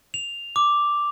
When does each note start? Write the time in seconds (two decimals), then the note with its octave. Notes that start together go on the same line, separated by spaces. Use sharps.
0.14 F7
0.56 D6